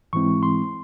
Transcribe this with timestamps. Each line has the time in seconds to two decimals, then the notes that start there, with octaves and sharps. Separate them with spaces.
0.13 G#2 E3 G#3 C4 E4 C#6
0.43 C6